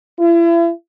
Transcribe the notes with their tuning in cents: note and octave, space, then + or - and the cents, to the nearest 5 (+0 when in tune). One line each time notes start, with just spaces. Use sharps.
E4 +40